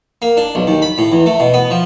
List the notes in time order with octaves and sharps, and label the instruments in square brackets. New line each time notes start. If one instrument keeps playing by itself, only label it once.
[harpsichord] A#3
D4
B1
D#2
B5
A2
E2
A3
B2
B3
F3